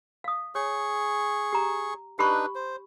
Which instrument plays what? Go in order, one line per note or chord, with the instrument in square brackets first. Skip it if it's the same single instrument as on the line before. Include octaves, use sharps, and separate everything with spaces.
[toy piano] F5 D#6
[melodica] G#4 C#6 [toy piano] C#5
[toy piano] G4 A#5
[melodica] D4 D#4 B4 [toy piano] G4 B5 C#6
[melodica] C5